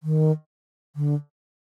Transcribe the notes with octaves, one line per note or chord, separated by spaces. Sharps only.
D#3
D3